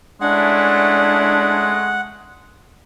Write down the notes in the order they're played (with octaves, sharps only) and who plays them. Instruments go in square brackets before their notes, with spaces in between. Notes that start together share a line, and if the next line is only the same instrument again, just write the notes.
[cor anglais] G#3 [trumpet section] A3 C#4 E4 [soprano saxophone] D4 [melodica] F#5